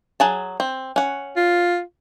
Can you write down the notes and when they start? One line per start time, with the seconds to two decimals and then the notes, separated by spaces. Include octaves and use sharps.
0.20 F#3 G#4 A5
0.60 C4
0.96 C#4 F#5
1.37 F4